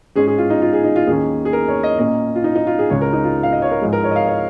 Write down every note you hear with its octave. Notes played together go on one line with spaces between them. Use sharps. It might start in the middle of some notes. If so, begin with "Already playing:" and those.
G#2 G#3 C#4 G#4
G#4
F4
D#4
F4
G#4
D#4
F4
D#2 D#3 A#3 C#4 G#4
G#4
A#4
C#5
D#5
A#2 A#3 C#4 D#5
F4
D#4
D#4
F4
G#4
C#2 C#3 G#3 C#5
A#4
D#4
F4
F5
D#5
C#5
A#4
G#2 F3 G#3 G#4
A#4
C#5
D#5
F5
C#5